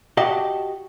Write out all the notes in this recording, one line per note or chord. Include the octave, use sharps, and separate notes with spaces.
F#4 G4 D#5 F#5 A5